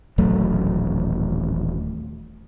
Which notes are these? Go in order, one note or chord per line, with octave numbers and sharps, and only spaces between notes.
D#1 A1 F#3 A3